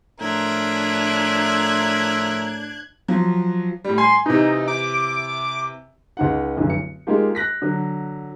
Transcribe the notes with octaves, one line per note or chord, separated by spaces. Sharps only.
A2 F3 D4 A#4 E5 F#6 G#6
F3 F#3
A2 G3
G#5 C6
C3 E3 D#4
D6
C#2 D#4 F#5
F1 B1 F#2 D3 E3
C#7
G#3 A#3 D#4 F4 G4
F#6 A#6 B6
D3 F#3